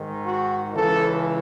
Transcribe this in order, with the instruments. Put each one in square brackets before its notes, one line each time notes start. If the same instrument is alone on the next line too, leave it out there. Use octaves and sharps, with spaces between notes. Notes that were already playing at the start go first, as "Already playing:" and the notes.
Already playing: [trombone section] G#2 D#3
F#4
C#2 C#3 E3 A4